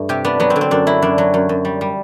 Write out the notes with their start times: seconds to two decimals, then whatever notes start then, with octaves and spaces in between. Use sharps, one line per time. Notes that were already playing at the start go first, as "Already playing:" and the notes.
Already playing: G2 A3
0.09 C3 G4
0.25 B3 D4
0.40 F#3 B3
0.50 C4
0.56 D3
0.61 C4
0.71 F#2 D4
0.87 F#3 E4
1.02 F#2 D4
1.18 F#3
1.34 F#2
1.49 F#2
1.65 G3
1.81 G3